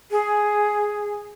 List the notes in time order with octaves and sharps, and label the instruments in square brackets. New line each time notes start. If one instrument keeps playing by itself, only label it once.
[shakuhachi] G#4